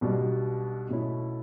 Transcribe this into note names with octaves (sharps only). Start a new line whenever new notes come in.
B1 B2 G3 D4
B1 B2 A3 C#4 E4